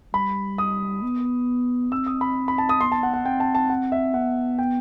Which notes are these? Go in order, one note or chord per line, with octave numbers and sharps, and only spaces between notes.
G3 B5
D#6
B3
C4 E6
D#6
B5
B5
A5
D#6
B3 C6
A5
F#5
F#5
C4 G5
A5
A5
F#5
E5
B3 F#5
G5